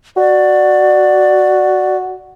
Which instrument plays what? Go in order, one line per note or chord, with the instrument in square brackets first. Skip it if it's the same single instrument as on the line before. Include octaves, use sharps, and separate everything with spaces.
[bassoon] F#4 [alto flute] D5